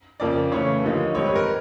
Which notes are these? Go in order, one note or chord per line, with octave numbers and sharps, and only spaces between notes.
F2 C#3 F3 A#3 D5
C#3 E3 A3 C#5
D#2 D3 F3 A#3 D#4
G#2 D#3 G3 C4 D#4 C#5
B4
A#4